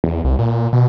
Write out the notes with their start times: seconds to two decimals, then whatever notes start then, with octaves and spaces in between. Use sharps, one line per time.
0.04 E2
0.24 C2
0.39 A#2
0.73 B2